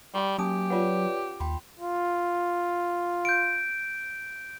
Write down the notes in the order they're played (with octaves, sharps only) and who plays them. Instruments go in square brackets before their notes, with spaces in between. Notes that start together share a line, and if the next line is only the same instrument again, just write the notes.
[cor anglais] G3 [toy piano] G4 G5
[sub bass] F#3 [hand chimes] A#3 G#5 [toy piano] C#4 A5 D#6 [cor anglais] G4
[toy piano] F4 F#5 [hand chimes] B4 C#5 D5
[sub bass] D#2 [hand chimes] G5 B5 C6
[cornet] F4
[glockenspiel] G6 D7